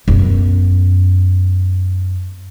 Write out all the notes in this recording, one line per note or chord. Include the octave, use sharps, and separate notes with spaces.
F#2 B3